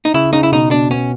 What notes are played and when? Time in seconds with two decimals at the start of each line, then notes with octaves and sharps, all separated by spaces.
0.05 D#4
0.14 C#3 E4
0.33 C#3 D#4
0.43 E4
0.52 B2 D#4
0.71 B2 D4
0.91 B3 C#4